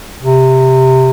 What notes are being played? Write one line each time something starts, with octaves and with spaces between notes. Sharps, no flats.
C3